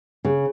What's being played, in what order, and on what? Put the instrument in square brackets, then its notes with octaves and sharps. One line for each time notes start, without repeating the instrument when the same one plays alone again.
[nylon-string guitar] C#3